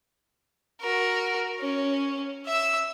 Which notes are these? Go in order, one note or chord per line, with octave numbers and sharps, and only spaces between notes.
F#4 A#4
C#4
E5 E6